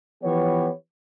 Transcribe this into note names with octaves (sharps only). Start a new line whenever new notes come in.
E3 F3 B3 G4 B4 C#5